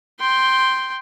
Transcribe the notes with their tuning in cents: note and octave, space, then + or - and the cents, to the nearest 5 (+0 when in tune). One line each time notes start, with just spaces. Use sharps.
G5 +0 C6 +0